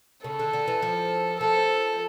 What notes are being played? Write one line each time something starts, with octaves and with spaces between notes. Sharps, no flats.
C#3 A4
D3
D3
E3
F3
F3 A4